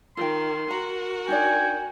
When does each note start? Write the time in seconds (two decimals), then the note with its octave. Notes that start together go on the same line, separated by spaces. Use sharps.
0.17 D#3 F4 G5 C6
0.71 F#4 A#4 A#5
1.28 D4 D#4 D5 G5 G#5